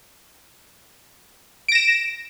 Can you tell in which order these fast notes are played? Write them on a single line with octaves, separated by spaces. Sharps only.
D7 A#6 E7